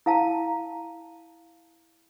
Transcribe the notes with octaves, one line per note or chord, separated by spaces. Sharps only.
E4 F5 A5 A#5